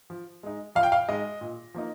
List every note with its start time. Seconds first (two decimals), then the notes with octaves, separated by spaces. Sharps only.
0.10 F3
0.43 G#3 D#4
0.75 F3 F5
0.83 G5
0.92 F5
1.08 G#3 D#4 D#5
1.41 A#2
1.74 F3 A#3 D#4